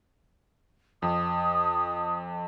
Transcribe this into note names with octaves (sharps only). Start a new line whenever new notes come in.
F2 D#6